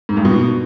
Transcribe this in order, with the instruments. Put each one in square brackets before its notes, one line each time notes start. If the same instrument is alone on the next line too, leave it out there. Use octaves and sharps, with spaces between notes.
[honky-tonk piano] G#2
G2
B2